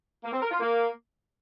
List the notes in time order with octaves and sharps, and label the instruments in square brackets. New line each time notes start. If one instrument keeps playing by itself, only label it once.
[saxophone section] A#3
C4
A#4
F4
A#3